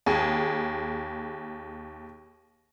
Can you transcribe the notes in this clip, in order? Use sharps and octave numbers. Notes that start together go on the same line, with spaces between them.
D#2 G#4